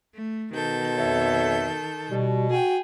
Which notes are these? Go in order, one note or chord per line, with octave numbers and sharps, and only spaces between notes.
A3
B2 D#3 A4 G6
F2 C#5 E5
B2 G3
F#4 G#4 G5